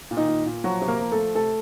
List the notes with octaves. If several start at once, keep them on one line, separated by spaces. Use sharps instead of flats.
A#2
D#3 D#4
A#2
A#2
F3 F#3 F#4
C3
A#3 A#4
F3
A3 A4
F3
C3 A3 A4